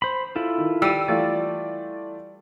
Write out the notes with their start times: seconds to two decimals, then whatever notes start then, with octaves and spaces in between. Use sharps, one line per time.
0.02 C5 B5
0.36 E4 F4 A4
0.58 D#3
0.82 G3 E6 D#7
1.08 E3 A3 F4 D5